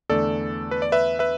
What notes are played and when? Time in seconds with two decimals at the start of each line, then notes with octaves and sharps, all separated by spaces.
0.10 E2 D3 A3 A4 D5
0.71 B4
0.82 D5
0.92 B4 E5
1.19 B4 E5